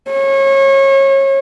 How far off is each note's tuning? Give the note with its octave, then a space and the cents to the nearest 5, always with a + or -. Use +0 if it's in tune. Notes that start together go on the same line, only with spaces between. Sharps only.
C#5 -30